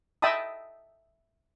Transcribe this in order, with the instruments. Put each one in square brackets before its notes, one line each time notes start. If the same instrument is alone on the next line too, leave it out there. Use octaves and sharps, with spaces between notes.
[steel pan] D#5 E5 G5 A5 B5 D#6